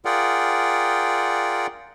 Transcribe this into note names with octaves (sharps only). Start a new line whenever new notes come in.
F4 G#4 A#4 D5 F#5 G5